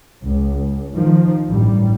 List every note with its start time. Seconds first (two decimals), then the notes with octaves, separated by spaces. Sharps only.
0.25 C#2
0.93 D#3 F3
1.49 A1 G2 G3